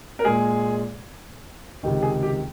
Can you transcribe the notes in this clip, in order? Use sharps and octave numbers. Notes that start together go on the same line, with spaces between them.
A#4
A#2 G#3 G#4
C#2 C3 D#3
G#4
G4